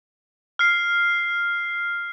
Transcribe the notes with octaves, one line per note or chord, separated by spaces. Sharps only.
F6 C7